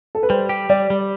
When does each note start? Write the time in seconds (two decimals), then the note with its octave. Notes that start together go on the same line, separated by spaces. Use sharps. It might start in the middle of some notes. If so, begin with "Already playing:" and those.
0.15 A4
0.23 B4
0.29 G3 C5
0.49 G4
0.70 G3 D5
0.90 G3